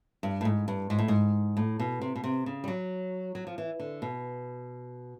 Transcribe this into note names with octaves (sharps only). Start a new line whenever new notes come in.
G2
A2
G#2
G2
G#2
A2
G#2
A2
B2
C3
B2
C3
C#3
G3
F#3
F#3
F3
E3
D3
B2